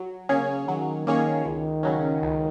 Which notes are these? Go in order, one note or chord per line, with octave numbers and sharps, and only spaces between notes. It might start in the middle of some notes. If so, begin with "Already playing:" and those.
Already playing: F#3
C#3 A#3 C#4 G#4 C#5
D#3 F#3
D#3 A#3 C#4 G#4 C#5
C#2 D#3
C#3 F#3 C#4
C#2